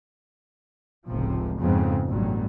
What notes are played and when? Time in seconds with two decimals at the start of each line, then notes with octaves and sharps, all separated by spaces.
1.07 F1 C#2 A2 C3 F3
1.59 F2 G#2 C#3 F3 B3 C4
2.06 A1 G2 B2 F#3 G3